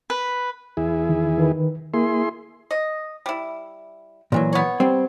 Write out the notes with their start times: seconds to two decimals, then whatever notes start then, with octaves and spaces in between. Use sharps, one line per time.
0.10 B4
0.77 E2 E4 G#4
1.09 D#3
1.38 D#3 B4
1.94 A#3 E4 G#4 C6
2.71 D#5
3.26 G3 E4
4.32 A#2 E3 F#3
4.53 B3 C#5
4.80 G3 C4